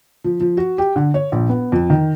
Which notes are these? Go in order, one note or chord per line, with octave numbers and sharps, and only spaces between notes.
F3
F3
F#4
G4
D3
C#5
A#1
B3
F2
D#3